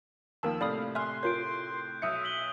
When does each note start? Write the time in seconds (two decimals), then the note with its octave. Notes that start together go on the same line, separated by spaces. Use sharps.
0.43 D#2 D#3 F3 A#3 A#4 A5 E6
0.61 A2 C3 A3 D5 F5 B5 D#6
0.95 E5 G#5 C6 F6 F#6
1.23 F4 A#4 C#5 G6 D7
2.02 B1 E5 D#6 G6 C#7
2.24 B6 F#7 G7